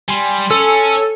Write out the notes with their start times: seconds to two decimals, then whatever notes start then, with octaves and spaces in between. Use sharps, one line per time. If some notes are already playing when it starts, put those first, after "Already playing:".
0.08 G3 G#5 C6
0.51 C#4 A4